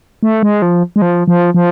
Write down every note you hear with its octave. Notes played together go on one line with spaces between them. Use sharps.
A3
G#3
F3
G#3
F3
F3
F3